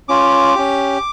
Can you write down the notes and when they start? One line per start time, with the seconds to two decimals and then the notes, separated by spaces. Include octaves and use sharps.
0.09 C#4 F4 D6
0.55 C#4 G4